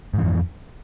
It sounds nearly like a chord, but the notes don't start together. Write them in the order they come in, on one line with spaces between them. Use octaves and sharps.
G#2 E3 F2